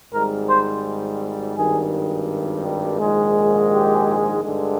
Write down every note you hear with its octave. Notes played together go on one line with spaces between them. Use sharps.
G#1 G#2 G3 A#4
C5
G#1 G2 D#3 G3 G#4
A#1 G#2 D#3 G#3
G4
G2 D3 G#3